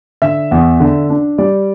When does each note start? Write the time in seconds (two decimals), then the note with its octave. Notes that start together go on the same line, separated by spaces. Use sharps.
0.22 D3 E5
0.51 E2
0.80 D3
1.10 D4
1.38 G3 D5